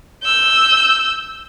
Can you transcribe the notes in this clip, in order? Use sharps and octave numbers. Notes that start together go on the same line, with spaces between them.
E6 G6